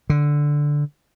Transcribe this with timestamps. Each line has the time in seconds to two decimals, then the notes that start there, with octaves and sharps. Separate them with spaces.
0.10 D3